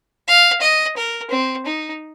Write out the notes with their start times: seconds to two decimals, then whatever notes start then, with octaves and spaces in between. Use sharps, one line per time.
0.27 F5
0.61 D#5
0.97 A#4
1.31 C4
1.66 D#4